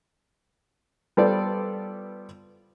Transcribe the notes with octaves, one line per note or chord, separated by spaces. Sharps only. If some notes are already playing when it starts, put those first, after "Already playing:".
G3 B3 F4 A4 C5 D5